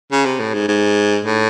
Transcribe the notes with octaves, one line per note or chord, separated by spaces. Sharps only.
C#3
C3
A2
G#2
G#2
A2